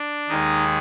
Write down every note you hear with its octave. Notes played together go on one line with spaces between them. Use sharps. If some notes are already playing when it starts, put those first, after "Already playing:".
Already playing: D4
D#2 D#3 G#3 D#4